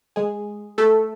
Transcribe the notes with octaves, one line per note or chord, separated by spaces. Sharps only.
G#3 G#4
A3 A4